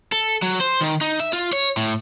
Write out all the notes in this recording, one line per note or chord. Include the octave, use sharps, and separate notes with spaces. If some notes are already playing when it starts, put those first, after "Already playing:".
A4
F#3
C5
D#3
D#4
E5
F4
C#5
A2